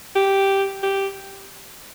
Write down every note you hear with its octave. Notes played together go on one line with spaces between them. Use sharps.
G4
G4